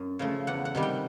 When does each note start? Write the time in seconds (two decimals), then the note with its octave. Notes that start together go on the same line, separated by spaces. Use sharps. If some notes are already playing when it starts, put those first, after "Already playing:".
Already playing: F#2
0.19 C#3 F3 A3
0.47 E2 F#5
0.65 F#5
0.75 C3 D#3 G3
0.82 G5